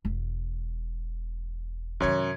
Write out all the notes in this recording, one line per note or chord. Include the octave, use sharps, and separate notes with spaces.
E1
F#2 C3 D#3 C#5 G#6